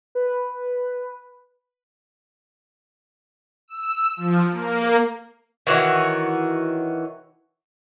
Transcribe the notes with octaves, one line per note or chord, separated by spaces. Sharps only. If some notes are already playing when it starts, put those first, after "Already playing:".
B4
E6
F3
A#3
D#3 E3 F#4 C#5